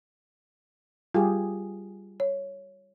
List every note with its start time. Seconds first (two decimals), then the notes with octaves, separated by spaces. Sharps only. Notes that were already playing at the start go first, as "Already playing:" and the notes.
1.14 G3 F4 G4 G#4
2.20 C#5